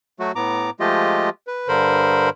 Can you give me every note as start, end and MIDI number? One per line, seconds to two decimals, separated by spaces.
0.20 0.32 54
0.20 0.32 57
0.20 0.32 66
0.35 0.70 45
0.35 0.70 59
0.35 0.70 82
0.35 0.70 86
0.80 1.29 53
0.80 1.29 56
0.80 1.29 57
0.80 1.29 65
0.80 1.29 67
0.80 1.29 75
1.47 1.68 71
1.68 2.30 43
1.68 2.30 50
1.68 2.30 70
1.68 2.30 72
1.68 2.30 83